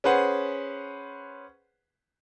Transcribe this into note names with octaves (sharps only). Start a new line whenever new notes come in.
C#4 G#4 B4 C5 F#5